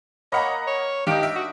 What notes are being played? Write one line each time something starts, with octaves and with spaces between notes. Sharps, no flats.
A#3 C#5 D#5 F#5 A#5 B5 C#6
C#5
D#3 D4 D#4 G4 F5 D7
E5
F#4